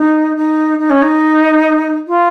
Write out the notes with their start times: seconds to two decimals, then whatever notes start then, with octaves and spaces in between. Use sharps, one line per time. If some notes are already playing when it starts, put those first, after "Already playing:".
Already playing: D#4
0.35 D#4
0.78 D#4
0.89 C#4
1.01 D#4
2.07 F4